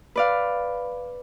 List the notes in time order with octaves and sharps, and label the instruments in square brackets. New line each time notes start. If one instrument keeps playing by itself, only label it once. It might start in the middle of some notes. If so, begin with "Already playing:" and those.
[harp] B4 D5 F5